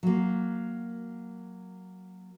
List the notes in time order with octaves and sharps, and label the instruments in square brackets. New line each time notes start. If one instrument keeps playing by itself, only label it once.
[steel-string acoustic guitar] F#3 A#3